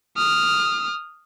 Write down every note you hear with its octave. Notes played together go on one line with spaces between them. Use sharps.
D#6 F6